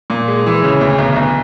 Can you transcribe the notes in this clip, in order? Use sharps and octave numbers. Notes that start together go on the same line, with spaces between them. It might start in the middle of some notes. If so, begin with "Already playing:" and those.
A#2
G#3
E3
C#3
D2
B1
B1